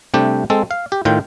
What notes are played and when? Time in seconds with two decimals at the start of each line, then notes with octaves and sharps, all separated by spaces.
0.14 C3 G3 A3 D4 G4
0.50 G#3 C4 A4
0.71 F5
0.92 G4
1.05 A2 D#3 F4 G5